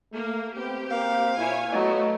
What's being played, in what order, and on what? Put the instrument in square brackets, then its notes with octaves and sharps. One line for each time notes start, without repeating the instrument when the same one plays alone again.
[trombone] A3 [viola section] A#3
[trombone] B3 [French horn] C4 [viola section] G4
[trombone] A#3 [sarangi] F5
[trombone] A#2 [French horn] E4 [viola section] C#5 G#5
[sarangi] F#3 [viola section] A3 [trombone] B3 [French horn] D#5